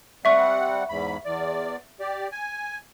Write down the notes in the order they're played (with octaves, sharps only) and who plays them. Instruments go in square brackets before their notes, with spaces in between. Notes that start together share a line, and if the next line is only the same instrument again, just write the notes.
[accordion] G3 C4 F#5 [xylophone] E5 C#6
[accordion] E2 G#2 B5
E2 D5
G4 D5
G#5